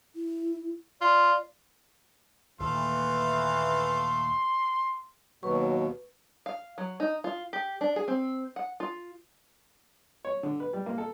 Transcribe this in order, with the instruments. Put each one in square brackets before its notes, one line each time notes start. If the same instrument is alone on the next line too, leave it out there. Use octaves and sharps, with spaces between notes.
[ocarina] E4
[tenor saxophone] F4 [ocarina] D5
[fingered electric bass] D#2 A#2 [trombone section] E3 [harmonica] A3 A4 F5 [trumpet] C6
[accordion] D#2 B2 [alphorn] F#3 [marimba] B4 C#6
[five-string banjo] F5
F#3
D#4
F4
G4
D4
G#4
C4
F#5
F4
[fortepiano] C#5
D3
B4
G3
A#3
A4